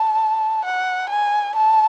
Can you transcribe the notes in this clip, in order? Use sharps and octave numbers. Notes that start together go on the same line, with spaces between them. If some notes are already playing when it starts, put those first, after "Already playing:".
Already playing: A5
F#5
G#5
A5